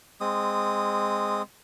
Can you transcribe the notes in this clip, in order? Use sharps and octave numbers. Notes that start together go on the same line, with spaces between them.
G#3 C4 D#6